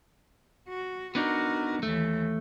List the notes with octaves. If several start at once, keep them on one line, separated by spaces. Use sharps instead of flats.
F#4
B3 D4 D#4 F#4 A#4
D#2 E3 A3